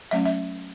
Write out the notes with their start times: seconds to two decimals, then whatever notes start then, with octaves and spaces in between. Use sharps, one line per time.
0.11 F#3 A3 C#4 E5
0.26 E5